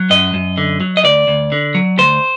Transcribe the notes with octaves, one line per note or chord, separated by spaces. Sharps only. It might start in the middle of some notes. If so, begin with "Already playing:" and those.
Already playing: F#3
F#2 D#5
F#2
D3
F#3
D#5
D2 D5
D2
D3
F#3
D2 C5